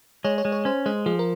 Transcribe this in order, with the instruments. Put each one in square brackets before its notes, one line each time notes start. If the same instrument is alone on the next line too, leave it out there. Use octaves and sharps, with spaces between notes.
[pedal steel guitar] G#3 [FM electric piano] C#5
[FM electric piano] C#5
[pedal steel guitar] G#3
[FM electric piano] C#5
[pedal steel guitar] C#4 [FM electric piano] C5
[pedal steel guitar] G#3 [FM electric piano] C5
[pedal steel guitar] F3 [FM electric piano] G#4
[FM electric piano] A#4